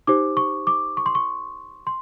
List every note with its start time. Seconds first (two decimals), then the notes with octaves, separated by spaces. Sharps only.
0.07 D#4 G4 C5 D6
0.37 C#6
0.67 D6
0.97 C#6
1.06 C6
1.15 C#6
1.87 C6